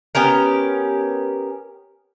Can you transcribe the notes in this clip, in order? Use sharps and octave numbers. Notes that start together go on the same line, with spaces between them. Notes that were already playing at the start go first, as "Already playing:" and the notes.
B3 C#4 G4 A#4